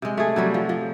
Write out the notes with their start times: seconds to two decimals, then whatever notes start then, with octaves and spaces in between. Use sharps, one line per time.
0.02 C3 G#3
0.17 A3 G#4
0.36 C3 F#3 G3
0.54 F3
0.69 F3